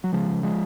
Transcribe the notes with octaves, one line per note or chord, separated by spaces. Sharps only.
F#3
C#3 F3 G#3
C#3
F3 G#3